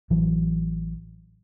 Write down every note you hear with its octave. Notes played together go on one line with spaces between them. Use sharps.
A1 E3 F#3